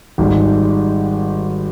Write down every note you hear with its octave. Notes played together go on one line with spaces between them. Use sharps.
G#1 G#2 G3